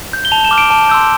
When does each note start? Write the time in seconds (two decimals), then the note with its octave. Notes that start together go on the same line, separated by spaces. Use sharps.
0.13 G6
0.25 G7
0.32 A5 F7
0.45 E7
0.51 D6 F6
0.58 D7
0.71 A5
0.89 C6 E6 G6